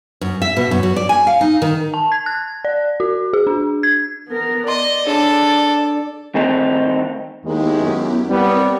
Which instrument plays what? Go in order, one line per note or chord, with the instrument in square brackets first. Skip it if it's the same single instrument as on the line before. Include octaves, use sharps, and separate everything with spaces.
[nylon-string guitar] F#2
E5
B2
F#2
F#3
D5
G#5
F5
D#4
D#3
[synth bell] A5
G#6
F#6
D5
F#4
G#4
D4
G#6
[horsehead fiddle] B3 A#4
[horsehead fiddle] D5 [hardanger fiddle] D#5 [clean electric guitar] C6
[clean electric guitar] D4 G#4 C#5 [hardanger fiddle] A4
[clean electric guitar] D#3 A3 C4 D#4
[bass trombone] D#2 [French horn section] D#3 G#3 [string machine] B3 E4 G4
[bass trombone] F#2
[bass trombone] G3 [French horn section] B3 [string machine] C4 A#4 C#5